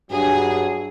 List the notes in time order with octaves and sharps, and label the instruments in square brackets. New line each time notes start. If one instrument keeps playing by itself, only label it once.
[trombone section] G2 [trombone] F#3 [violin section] G#4